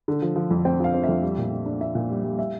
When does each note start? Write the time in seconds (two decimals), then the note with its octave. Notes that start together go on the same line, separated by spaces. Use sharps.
0.08 D3
0.22 F3
0.36 F3
0.51 F2
0.65 C4 G5
0.80 F3 F5
0.94 C4
1.04 F2 E5
1.22 G3
1.38 A#2
1.52 D4
1.66 D4
1.81 D4 E5
1.95 A#2
2.10 G3
2.24 G3
2.39 E5